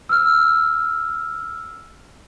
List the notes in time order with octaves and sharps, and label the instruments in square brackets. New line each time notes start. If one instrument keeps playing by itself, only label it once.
[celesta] E6 F6